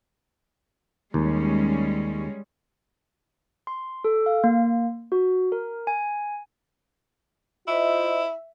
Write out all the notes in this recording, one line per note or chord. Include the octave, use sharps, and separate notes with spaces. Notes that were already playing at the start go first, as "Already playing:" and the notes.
D#2 G3 G#3 C#4
C6
A4
F5
A#3
F#4
A#4
G#5
E4 F4 C5 D#5 E5